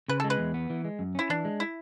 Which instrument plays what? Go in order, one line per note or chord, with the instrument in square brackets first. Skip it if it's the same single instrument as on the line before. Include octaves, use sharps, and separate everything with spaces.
[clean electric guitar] C#3 [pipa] B4
[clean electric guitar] G#3 [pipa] A4
[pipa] B4
[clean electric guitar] E2
B3
E3
G#3
F#2
[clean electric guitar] C#4 [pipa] E4
[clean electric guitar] E3 [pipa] D4
[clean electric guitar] G#3
[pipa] E4